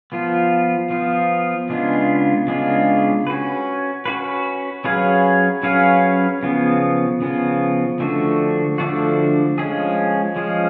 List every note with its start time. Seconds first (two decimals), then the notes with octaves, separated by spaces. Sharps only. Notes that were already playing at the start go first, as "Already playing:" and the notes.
0.12 F3 B3 F4
0.90 F3 B3 F4
1.69 C#3 G#3 B3 D4 F4
2.48 C#3 G#3 B3 D4 F4
3.27 C#4 F#4 B4
4.06 C#4 F#4 B4
4.84 F#3 C#4 G#4 B4 F5
5.63 F#3 C#4 G#4 B4 F5
6.43 C#3 F3 B3
7.22 C#3 F3 B3
8.00 D3 F3 A3 D4 F#4
8.78 D3 F3 A3 D4 F#4
9.58 F3 G#3 C#4 G#4
10.36 F3 G#3 C#4 G#4